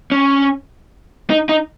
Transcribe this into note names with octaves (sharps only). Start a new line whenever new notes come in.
C#4
D#4
D#4